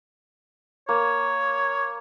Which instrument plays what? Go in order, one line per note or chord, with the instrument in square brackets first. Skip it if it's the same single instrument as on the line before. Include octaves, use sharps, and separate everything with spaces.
[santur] A#3 [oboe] C#5